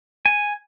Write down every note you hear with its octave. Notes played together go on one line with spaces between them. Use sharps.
G#5